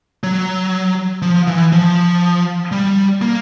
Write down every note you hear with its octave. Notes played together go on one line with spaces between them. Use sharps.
F#3
F3
E3
F3
G3
A#3